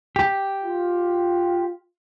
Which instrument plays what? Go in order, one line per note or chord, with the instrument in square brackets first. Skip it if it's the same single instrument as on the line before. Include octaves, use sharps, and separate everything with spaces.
[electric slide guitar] G4
[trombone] F4